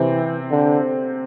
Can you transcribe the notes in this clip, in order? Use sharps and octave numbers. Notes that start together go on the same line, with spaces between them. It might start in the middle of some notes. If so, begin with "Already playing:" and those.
Already playing: C3 E3 C4
D3